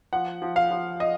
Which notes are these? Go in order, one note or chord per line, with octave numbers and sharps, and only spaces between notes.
F3 F#5
F3
F5
F3
D#5